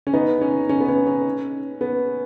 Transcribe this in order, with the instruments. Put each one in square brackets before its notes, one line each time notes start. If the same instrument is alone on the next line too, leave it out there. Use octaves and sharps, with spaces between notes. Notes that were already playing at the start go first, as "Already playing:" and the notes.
[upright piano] C#4
B3 D#4
C#4
C#4
B3
C#4
C#4
B3